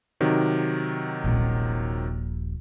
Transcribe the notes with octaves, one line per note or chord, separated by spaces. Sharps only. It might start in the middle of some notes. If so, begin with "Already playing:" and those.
C3 D#3 F#3
D#1 A#1